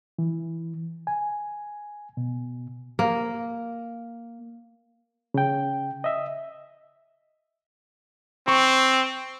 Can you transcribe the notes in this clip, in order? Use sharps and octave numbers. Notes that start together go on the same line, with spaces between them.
E3
G#5
B2
A#3
C#3 G5
D#5 E5
C4 C#6